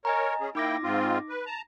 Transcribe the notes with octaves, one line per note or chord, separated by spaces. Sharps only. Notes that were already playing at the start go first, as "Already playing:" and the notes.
A#4 C#5 D#5 G#5 A#5
C#4 G#4
A#3 D#4 E4 G5 D6 A#6
G#2 C4 F4
B4
A5 A#5